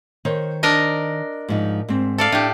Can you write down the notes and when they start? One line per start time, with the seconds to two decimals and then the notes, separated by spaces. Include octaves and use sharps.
0.25 D#3 C5 C#5
0.63 D4 A#4 D#5
1.48 G#2 F3 D#4
1.89 G#2 C4
2.18 A4 D5 F5
2.32 A2 D4 G4